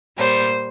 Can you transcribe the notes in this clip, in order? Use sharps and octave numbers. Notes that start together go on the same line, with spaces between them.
A#2 G3 C5